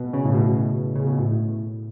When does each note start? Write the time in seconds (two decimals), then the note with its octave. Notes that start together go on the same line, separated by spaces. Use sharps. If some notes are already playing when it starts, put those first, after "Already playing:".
Already playing: B2
0.13 C#3
0.25 A2
0.34 B2
0.96 C#3
1.06 B2
1.18 A2